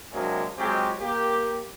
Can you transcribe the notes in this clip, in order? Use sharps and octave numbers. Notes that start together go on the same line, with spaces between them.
C3 F#3 G#3 A#3 D4
F#3 G#3 C4 F4 G4
A#3 G4